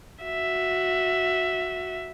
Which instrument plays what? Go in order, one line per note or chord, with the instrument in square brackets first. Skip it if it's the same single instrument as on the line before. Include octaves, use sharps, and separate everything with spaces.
[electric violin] F#4 E5